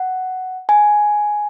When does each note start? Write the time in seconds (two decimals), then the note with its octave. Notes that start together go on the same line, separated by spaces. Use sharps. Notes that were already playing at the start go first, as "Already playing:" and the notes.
Already playing: F#5
0.69 G#5